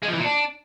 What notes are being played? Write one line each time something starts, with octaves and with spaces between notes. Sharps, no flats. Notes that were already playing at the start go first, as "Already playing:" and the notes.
G#3
F3
E3
A#2
D4